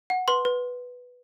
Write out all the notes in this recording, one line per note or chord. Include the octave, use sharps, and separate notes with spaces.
F#5
B4 C6
B4